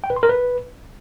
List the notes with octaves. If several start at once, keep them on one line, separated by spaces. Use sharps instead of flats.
G5
B4
C6
A#4
B4